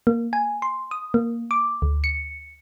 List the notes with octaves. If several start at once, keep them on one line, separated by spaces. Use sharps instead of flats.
A#3
G#5
C6
D#6
A#3
D6
D2
C#7